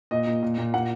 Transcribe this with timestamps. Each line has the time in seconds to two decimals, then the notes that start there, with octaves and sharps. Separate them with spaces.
0.11 A#2 D#5
0.27 A#2
0.43 A#2
0.58 A#2
0.74 A#2 F#5